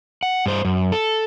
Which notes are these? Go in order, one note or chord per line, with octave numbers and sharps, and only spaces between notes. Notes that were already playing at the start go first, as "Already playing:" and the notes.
F#5
G2 C5
F#2
A4